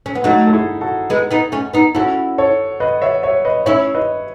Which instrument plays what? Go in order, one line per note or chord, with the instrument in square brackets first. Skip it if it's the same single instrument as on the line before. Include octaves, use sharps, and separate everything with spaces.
[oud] C#4
B3
[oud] F#3 A3 [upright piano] D#4 F#4
[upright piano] A4
E4 G#4
F#4 A4
[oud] G#3 B3
B3 D#4
A3 C#4
B3 D#4
[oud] C#4 E4 [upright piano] F#4 A4
[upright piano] A4 C#5
B4 D#5
C#5 E5
C#5 E5
B4 D#5
[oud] C#4 E4 [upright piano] C#5 E5
[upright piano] B4 D#5